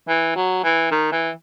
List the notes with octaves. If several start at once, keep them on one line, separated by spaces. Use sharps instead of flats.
E3
F#3
E3
D#3
E3